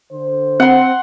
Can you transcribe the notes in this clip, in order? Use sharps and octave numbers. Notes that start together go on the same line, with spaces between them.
D3 C5
C4 F#5 C6